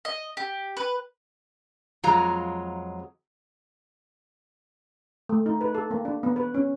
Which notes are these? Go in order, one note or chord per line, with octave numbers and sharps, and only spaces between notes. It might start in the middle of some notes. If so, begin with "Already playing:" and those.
D#5
G4
B4
F2 F#3 G#3 F4 A#5
A3
D#4
B4
A4
A#3
D4
B3
B4
C#4